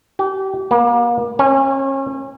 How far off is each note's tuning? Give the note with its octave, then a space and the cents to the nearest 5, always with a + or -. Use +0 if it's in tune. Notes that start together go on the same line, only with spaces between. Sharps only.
G4 -35
A#3 +35
C#4 -35